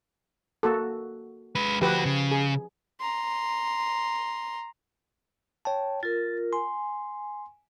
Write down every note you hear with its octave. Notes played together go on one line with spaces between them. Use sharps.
A#3 F#4 A4
G#3 B4
D2 F3 F#4 G4 B4
C#3
G#4
A#5 C6
C#5 G5 A5
F4 A#4 A6
G#5 C6